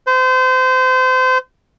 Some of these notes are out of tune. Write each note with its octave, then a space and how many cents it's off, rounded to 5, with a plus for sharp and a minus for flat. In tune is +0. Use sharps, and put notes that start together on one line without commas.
C5 -30